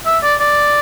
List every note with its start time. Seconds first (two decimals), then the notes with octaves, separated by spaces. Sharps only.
0.06 E5
0.23 D5
0.40 D5